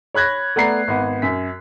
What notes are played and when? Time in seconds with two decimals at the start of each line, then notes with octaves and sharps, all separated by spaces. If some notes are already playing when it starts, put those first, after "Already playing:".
0.14 C#5 B5 F#6 G#6 A#6
0.56 A3 B3 D5 A#5 C7
0.88 G#1 B3
1.22 F#2 B6